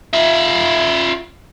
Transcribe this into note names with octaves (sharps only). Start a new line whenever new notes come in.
F4 E5